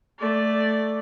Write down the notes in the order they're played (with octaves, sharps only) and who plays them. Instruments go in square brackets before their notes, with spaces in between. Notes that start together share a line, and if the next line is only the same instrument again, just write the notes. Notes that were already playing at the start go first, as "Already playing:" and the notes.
[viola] A3 D5